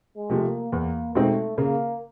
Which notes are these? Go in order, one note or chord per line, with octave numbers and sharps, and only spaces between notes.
G#3
C3 F3 A3
A#3
E2 A#3
B2 G#3 A3 C4 D#4
C#3 A#3